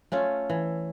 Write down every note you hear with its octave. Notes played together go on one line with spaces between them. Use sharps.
A3 C#4 F4
E3